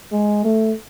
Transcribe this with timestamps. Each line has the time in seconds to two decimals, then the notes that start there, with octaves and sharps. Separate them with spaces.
0.12 G#3
0.45 A3